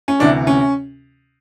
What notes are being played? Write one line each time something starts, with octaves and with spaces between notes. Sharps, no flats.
C#4
D2 C3 E3 D4
C#4